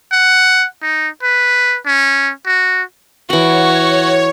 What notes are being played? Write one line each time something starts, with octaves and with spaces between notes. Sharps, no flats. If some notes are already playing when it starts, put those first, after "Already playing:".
F#5
D#4
B4
C#4
F#4
E3 F#4 C#5 F#5